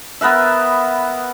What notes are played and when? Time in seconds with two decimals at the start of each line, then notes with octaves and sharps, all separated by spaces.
0.21 B3 A#4 B4 E5